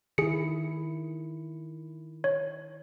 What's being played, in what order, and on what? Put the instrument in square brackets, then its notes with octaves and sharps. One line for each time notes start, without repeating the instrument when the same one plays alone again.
[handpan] D#3 E4 [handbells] G#4 C#7
[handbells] C#5